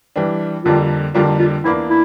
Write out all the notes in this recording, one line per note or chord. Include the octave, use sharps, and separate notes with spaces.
E3 G3 D4
F2 D3 G3 A#3 D4 F4
F2 D3 G3 A#3 D4 F4
F4
E2 E3 A#3 D4 E4
E4